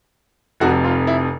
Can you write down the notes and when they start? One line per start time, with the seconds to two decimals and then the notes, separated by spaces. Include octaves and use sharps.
0.60 F1 F2 C3 F#4
0.84 F4
1.07 E4